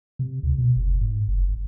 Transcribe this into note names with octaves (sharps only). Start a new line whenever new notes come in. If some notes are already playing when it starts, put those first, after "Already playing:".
C3
D2
B2
F#1
G#2
F#1
G1